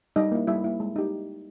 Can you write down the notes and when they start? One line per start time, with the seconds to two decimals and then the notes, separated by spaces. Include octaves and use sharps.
0.16 G3 D#4 D#5
0.32 A#3 E4
0.47 G3 E4 E5
0.64 A#3 E4
0.80 G#3
0.96 D#4 G4